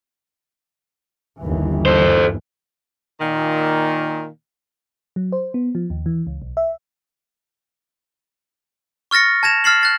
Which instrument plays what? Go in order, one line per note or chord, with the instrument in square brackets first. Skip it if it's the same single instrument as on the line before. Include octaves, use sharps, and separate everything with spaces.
[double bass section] G1 D#2 E3
[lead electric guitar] A4 C5
[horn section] A#2 D#3
[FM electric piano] F#3
C5
B3
F3
D#2
E3
C#2
B1
E5
[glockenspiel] C#6 F6 A6 A#6 C#7
A5 G#6 A#6 E7 F7
F6 A6 C7 F#7
F#6 A6 C7